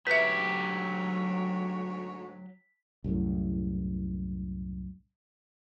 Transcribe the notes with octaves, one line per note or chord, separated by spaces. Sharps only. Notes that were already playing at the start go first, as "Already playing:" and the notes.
D2 G#2 F#3 G4 B4 C#5 E5 B6
C2 F#2 A2